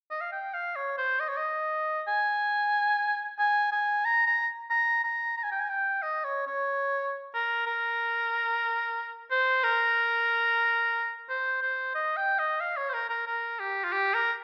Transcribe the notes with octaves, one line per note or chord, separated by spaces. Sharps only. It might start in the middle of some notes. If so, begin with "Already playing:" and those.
D#5
F5
G5
F5
C#5
C5
D#5
C#5
D#5
G#5
G#5
G#5
A#5
A#5
A#5
A#5
A#5
G#5
G5
G#5
G5
D#5
C#5
C#5
A#4
A#4
C5
A#4
C5
C5
D#5
G5
D#5
F5
C#5
C5
A#4
A#4
A#4
G4
F4
G4
A#4